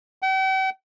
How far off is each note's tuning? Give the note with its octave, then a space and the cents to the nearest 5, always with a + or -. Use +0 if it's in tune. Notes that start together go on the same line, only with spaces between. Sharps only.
G5 -45